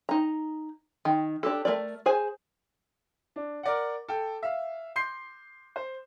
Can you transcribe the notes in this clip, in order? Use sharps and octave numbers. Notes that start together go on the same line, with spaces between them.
D#4 A#5
D#3
D4 G4 A4
A3 C4 A#4 D5
G#4 C5 G#5
D4
A#4 D5 F#5
A4 G5
E5 F5
C6 G6 C7
C5